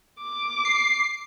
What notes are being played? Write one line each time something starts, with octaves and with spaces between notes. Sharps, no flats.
D6
C7